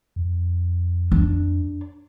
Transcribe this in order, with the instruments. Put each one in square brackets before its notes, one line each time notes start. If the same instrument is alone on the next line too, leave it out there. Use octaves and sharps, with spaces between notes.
[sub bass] F2
[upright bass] D4